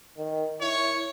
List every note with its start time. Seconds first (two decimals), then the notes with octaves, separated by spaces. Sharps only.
0.18 D#3
0.60 E4 C#5